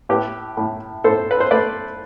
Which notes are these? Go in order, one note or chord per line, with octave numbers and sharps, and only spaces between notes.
A2 G4 B4
A2
A2 A4 C5
B4
C5
A3 B4 D5